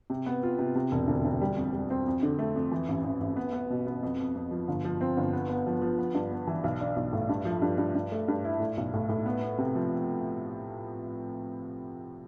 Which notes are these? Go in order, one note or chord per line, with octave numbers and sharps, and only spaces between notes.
C3
B3
F4
C3
C3
E1
D2
D2
G3
F2
G3
C4
F2
D3
A3
F2
E3
A1
A1
A1
B3
B3
B2
B3
F2
F2
F2
F3
G1
F3
C4
G1
B3
B3
F3
F3
B3
G2
B3
E3
B1
D4
B1
A2
G2
F3
G2
G2
G2
A3
G2
E4
A2
B1
A2
A2
B3
B3
C3
F3